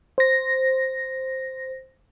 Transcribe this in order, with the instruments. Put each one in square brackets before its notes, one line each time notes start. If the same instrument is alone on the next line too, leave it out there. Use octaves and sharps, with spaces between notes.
[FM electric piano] C5 A#6